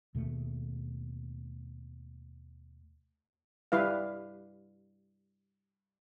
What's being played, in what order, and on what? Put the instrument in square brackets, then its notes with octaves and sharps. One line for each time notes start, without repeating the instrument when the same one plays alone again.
[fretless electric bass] D#2 B2 A3
[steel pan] G3 E4 B4 F5